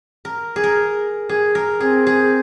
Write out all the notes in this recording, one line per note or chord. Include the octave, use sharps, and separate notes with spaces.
A#4
G#4
A#4
G#4
A#4
C4 G#4
G#4